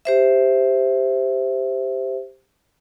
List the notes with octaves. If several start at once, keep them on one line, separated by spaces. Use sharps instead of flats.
G4 C5 E5